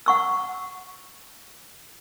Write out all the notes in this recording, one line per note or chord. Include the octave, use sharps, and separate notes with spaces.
F#5 C#6 E6